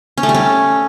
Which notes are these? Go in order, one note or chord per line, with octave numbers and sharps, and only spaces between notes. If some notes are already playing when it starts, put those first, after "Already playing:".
C#4
A3
G3
C#4